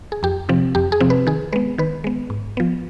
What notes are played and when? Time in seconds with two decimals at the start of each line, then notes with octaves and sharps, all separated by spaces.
0.12 G#4
0.23 F2 G4
0.49 C3 F3 C4
0.75 F2 G4
0.92 G#4
1.00 C3 F3 C4
1.10 B4
1.27 D#3 G#4
1.52 G#3 B3 B4
1.78 D#3 B4
2.04 G#3 B3
2.30 G#2
2.57 F3 B3